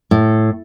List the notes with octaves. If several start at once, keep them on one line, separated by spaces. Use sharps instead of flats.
A2